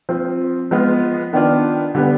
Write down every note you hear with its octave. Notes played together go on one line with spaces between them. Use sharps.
F3 C4 F4
F3 G#3 B3 F4
D#3 B3 D4 F4
D3 G3 B3